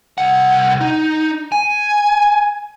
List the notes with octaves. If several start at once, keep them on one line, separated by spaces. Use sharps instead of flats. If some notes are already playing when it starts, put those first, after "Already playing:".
C2 F#5
D#4
G#5